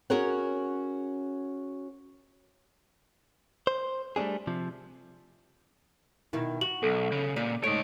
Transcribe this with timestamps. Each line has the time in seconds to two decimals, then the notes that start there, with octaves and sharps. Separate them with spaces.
0.10 C#4 F#4 G#4 A#4 C#5 F#5
3.67 C5
4.16 G3 A3 C4 D4 G#4
4.47 C3 F3
6.33 B2 D#3 E4
6.61 F#4 F#7
6.83 B1 A4
7.12 C#3
7.36 A#2 D5
7.64 G#2 A3 C#5 D#5 D7